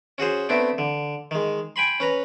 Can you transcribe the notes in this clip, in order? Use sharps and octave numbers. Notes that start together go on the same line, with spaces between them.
C#4 F#4 G#4 C5
A3 B3 C4 D4
D3
D#3 G#3
G5 G#5 B5 C6
C#4 B4 A#5